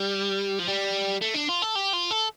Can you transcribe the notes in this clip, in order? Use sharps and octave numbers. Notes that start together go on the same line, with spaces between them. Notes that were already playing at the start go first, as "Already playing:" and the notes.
Already playing: G3
F3
G3
A3
D4
F4
A4
G4
F4
A4